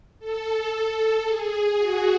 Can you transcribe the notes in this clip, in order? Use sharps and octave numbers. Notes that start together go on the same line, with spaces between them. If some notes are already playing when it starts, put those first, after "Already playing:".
A4
G#4
F#4